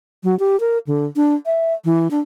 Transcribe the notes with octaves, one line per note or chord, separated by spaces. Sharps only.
F#3
G4
A#4
D3
D4
E5
E3
D4